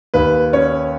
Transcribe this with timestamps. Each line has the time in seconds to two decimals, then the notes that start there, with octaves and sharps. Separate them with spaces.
0.14 D#2 B4
0.53 C#4 C#5